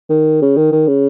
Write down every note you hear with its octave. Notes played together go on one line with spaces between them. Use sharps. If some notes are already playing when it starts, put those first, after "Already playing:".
D#3
C#3
D#3
D#3
C#3